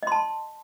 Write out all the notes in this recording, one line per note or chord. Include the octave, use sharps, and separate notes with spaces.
D#5 A5 C6